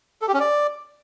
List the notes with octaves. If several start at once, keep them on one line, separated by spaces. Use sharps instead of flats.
A4
G4
C#4
D5